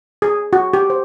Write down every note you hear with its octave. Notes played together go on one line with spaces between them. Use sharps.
G#4
F#4
G4
C5